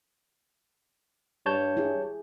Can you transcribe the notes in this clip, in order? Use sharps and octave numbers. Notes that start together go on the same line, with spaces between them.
G2 C#5 A5 G6
E4 G4 G#4